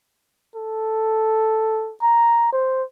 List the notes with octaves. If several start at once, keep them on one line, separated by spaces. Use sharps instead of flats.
A4
A#5
C5